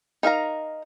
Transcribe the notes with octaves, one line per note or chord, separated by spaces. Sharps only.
D#4 A#4 F5 A#5